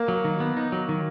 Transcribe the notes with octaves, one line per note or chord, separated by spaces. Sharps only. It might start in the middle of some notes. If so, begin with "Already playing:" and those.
Already playing: A#3
F#3
D#3
B3
D#4
F#3
D#3